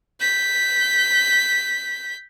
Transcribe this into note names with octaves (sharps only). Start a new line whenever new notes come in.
G6 B6